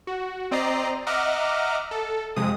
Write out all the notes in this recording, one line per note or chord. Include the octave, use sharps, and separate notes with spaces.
F#4
C4 D5 D#5 A#5 C7
D#5 E5 F#5 A#5 D6 F6
A4
F2 C3 G#3 D#6